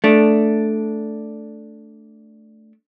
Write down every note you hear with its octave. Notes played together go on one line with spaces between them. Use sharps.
A3 D4